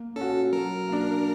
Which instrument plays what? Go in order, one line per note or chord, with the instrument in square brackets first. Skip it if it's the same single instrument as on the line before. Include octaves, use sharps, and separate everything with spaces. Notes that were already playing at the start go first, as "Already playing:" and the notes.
Already playing: [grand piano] A#3
[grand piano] C#4 F#4 [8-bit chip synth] A4
[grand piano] F#3 [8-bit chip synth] A#4
[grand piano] A#3 D4